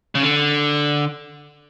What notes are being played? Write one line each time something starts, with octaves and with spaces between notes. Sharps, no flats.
C#3
D3